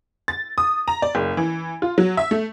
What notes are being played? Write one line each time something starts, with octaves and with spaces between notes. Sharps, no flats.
A6
D#6
A#5
D5
F#1
E3
F4
F#3
E5
A3